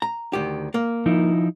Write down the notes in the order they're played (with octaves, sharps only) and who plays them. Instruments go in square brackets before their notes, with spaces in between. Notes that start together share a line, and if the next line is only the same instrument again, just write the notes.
[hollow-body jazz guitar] A#5
D2 D#3 G4
A#3
[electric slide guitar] F3 D#4 E4